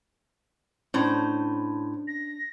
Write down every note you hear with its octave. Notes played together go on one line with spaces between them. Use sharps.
A2 C#4 D4 C5
A#6